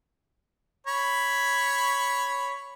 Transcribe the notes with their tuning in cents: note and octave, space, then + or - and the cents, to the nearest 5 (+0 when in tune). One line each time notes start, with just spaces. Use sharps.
C#5 +0 B5 +0